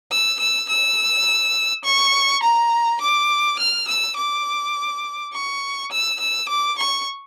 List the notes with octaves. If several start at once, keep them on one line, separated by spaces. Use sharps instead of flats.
E6
E6
E6
C#6
A#5
D6
F6
E6
D6
C#6
E6
E6
D6
C#6